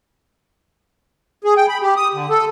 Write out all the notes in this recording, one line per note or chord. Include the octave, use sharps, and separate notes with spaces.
G#4
G5
B5
G4
D#6
D3
A4